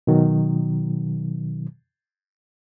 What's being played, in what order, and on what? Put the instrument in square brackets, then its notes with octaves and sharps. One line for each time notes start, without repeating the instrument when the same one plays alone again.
[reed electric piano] B2 D#3 F#3